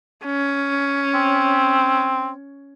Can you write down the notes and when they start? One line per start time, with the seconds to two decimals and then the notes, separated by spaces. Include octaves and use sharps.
0.25 C#4
1.14 C4